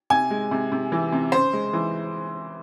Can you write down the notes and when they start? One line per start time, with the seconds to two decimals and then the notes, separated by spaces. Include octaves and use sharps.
0.10 C3 G#5
0.30 G#3
0.51 C3
0.72 C3
0.92 E3
1.12 C3
1.32 C#3 C5
1.53 G#3
1.73 E3